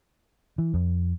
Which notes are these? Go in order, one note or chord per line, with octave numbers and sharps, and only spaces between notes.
E3
F2